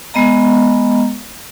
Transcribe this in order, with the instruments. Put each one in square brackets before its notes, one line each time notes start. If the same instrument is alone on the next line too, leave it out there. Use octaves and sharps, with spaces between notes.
[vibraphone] G#3 B3 D#5 A#5